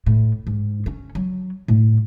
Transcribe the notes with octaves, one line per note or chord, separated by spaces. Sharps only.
A2
G#2
C#4
F#3
A2